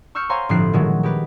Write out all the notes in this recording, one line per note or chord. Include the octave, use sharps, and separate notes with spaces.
C#6 E6 F6 G6 C#7
C5 C#5 F5 G#5 A#5 C6
G1 A2 F3 C4 F#6 C7
A#2 D#3 F#3 G#3 A3
G#3 G4 B4